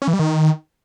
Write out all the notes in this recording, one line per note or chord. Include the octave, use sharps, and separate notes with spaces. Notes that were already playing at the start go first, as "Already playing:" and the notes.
C#4
E3
G3
D#3